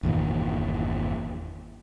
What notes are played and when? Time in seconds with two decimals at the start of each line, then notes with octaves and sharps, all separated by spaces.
0.03 G1 E2 A#2 D#3